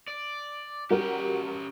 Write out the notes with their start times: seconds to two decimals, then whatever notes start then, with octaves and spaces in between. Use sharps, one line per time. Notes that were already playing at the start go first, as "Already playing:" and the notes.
0.08 D5
0.90 G3 C#4 F#4 G4 A#4